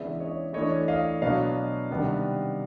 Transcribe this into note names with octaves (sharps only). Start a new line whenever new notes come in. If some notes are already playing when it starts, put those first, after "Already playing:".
Already playing: C#3 E3 G#3 B3 D4 D5 E5
C#5 D#5
E3 A3 D4 C#5 D#5
D#5 F5
B2 F#3 B3 D4 D#5 F5
C3 D#3 G3 B3 D4